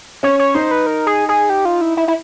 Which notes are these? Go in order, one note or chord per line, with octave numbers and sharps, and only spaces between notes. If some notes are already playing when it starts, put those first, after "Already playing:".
C#4 C#5
C#5
D#4 C5
B4
A#4
G#4
G#4
G4
F4
E4
E4
E4